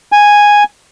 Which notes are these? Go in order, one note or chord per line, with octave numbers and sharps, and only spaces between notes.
G#5